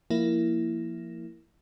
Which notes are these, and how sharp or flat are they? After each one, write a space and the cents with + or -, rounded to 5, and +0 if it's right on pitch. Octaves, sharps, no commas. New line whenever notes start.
F3 -10 A#3 +0 E4 +5